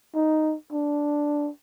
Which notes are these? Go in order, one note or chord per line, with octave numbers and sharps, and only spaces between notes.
D#4
D4